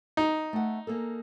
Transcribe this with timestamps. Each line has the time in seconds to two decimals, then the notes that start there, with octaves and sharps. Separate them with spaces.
0.17 D#4
0.53 A3 F#5
0.87 A#3 G#4 A4